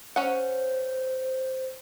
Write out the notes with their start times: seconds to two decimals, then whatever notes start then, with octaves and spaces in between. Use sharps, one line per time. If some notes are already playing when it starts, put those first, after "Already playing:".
0.16 C#4 C5 F#5